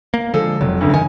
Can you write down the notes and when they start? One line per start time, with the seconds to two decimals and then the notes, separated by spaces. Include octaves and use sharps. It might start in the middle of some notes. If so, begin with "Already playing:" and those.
0.14 A#3
0.34 D3 F3 G#3 A4
0.61 F1 F#3
0.81 D2 G2 C#3
0.94 D#3 G#5